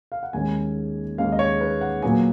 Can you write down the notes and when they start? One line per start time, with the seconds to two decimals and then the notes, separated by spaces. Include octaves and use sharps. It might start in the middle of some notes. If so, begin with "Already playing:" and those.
0.12 F5
0.23 F#5
0.33 D#2 D#3 G#3 C#4 G#5
1.18 D#2 D#3 G#3 C#4 F5
1.32 D#5
1.39 C#5
1.61 B4
1.81 F#5
2.02 A#2 F#3 B3 G#5